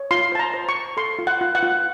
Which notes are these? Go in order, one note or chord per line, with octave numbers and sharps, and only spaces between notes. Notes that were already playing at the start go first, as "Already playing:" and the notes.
Already playing: C#5
F4 C6
C5 A5
A#5
C5
C#6
C5
A4 C6
F4
F#5
F4
F#5
F4